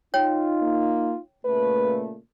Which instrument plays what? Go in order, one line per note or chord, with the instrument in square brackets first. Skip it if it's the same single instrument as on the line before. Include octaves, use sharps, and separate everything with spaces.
[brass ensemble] D#4 F4 [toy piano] C#5 G5
[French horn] A#3
[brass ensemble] A#2 C#3 A3 [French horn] B4